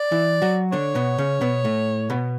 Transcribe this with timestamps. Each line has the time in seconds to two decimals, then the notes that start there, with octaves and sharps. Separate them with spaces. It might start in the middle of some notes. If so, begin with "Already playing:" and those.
Already playing: D5
0.12 E3 E4
0.42 F#3 F#4
0.72 D3 D4 C#5
0.95 B2 B3
1.18 C#3 C#4
1.41 B2 B3
1.64 A2 A3
2.10 B2 B3